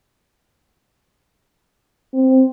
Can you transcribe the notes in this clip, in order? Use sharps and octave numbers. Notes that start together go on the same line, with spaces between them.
C4